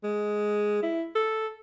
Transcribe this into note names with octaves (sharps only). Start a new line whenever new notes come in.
G#3
E4
A4